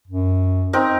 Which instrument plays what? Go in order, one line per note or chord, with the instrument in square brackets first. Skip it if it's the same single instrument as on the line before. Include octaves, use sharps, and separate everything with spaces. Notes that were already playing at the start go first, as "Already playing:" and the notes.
[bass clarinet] F#2
[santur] C4 D#4 A#4